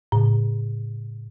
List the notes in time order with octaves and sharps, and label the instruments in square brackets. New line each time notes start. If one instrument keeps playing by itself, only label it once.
[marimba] A2 C#3